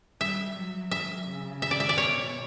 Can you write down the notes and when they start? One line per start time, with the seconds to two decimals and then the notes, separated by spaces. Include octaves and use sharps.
0.21 G3 E5
0.56 F#3
0.91 F#3 E5
1.27 C#3
1.62 E5
1.71 D5
1.80 E5
1.89 D5
1.97 B2 C#5